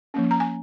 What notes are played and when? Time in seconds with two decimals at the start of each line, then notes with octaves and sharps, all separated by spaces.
0.14 F3 A#3 C#4
0.31 A#5
0.40 G#5